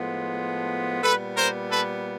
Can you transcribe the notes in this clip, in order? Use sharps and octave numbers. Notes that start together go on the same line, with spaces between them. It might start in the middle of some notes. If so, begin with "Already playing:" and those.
Already playing: A2 F3 G#3 B3
A#2 G3 B3 A4 B4
A#4 C5
A4 B4